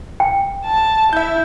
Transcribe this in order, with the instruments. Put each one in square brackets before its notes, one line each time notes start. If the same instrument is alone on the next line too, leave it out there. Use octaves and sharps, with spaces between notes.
[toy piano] G5
[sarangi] A5
[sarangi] E4 [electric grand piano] E5 G6